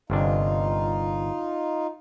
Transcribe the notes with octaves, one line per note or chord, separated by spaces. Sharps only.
G1 C3 D4 D#4 F4